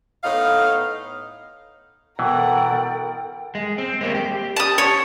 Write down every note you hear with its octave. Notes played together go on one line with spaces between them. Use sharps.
A2 B3 D#4 F5
B2 E3 A4 A#4 F#5 G5 A#5
G#3
C4
G#3 A#3 G4
G4
A5 D#6
C#5